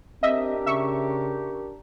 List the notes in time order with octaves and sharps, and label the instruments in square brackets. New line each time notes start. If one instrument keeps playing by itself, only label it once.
[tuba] C4 [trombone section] D4 G4 A#4 [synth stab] D#5 E5
[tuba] C#3 [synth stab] E5 C#6